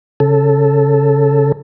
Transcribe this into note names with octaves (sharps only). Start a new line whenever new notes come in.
C#3 A4